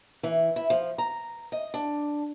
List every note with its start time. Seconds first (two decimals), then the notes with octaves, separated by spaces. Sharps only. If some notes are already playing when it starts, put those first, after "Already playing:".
0.23 E3
0.56 E4
0.70 F3
0.98 A#5
1.52 D#5
1.74 D4